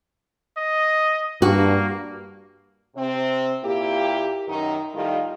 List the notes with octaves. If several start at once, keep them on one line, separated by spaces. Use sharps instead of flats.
D#5
G2 A#3 F#4
C3 C4
A#2 A#3 E4 G4
F#2 D#3 D#4
A2 D#3 G3 F4 D#5